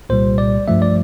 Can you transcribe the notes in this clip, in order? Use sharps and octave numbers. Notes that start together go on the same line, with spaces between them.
C2 A#2 G3 C5
D5
G2 F3 A3 E5
D5